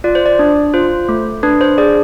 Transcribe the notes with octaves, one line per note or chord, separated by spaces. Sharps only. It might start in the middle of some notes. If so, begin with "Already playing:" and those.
F4 D5
C5
D5
D4
F4 C5
A3
D4 B4
C5
G#4 D5